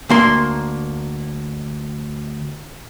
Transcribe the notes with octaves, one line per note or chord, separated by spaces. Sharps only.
D2 A#3 C6